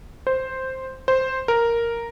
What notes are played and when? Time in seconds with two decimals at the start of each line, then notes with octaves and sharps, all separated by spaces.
0.27 C5
1.08 C5
1.48 A#4